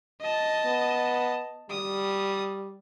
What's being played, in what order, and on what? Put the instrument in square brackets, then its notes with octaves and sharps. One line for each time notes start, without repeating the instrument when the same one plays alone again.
[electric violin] D#5 A5
[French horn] B3
[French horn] G3 [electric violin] D#6